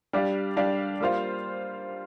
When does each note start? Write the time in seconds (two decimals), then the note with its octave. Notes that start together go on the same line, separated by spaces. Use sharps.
0.13 G3 D4 G4 D5 F5
0.57 G3 D4 G4 D5 F5
1.00 G3 A#3 F4 C5 F5